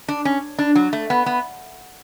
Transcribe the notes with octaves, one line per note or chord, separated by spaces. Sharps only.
D4
C#4
D4
F#3
A3
B3
B3